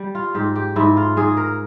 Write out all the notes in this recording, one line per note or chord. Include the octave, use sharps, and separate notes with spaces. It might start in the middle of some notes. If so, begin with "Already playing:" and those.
Already playing: G3
F4
G#2 G4
G4
G#2 E4
F4
G#2 G#4
A#4